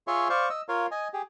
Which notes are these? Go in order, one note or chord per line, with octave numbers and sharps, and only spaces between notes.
F4 G#4 C#5 E5 C6 C#6
C5 D5 F5 C#6
D#5 E6
F4 A#4 C#5 F5
D#5 G#5
G4 G#4